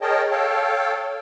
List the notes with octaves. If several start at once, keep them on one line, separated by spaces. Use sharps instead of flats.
G#4 A#4 C#5 D#5 G5 A5
A4 C#5 F5 G5 A5